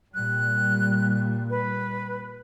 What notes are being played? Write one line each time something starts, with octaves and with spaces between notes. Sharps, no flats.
A#2 G3 F#6
B4